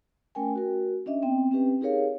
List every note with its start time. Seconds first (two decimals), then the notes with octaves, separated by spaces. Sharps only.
0.35 A3 C#4 A#4 G5 G#5
0.55 F#4 A#4
1.06 C#4 D4 D#5 E5
1.22 B3 C4 G5
1.51 C4 C#4 G4 B4
1.81 D#4 G4 G#4 A#4 C#5 F5